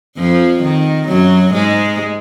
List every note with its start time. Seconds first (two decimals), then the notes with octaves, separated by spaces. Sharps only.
0.18 F2 F3
0.63 D#3
1.08 F#2 F#3
1.53 G#2 G#3